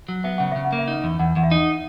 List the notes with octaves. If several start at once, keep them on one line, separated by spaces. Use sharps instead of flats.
F#3
B3 E5
C#3 F#5
C#3 E5
F#5
A#3
E5
D#4
E2
E2 F#5
E2 F#5
E5
D#4